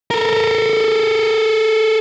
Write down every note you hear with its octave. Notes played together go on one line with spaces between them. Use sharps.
A4 A#4